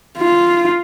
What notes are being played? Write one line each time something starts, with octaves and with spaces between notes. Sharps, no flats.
F4